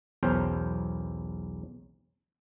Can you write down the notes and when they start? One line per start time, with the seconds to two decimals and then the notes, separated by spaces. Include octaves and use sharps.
0.23 B1 E2 C#4 A#4 C5 G5